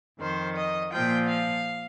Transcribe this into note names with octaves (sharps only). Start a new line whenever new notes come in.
F2 D#3 C5
D#5
A#2 F3 G5
F5